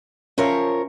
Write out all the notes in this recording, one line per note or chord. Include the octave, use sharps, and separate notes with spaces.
F3 C#4 A#4 C#5 E5 F5